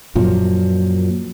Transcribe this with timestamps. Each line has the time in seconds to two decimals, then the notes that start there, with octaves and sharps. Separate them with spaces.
0.15 F#2 A#2 F3 F#3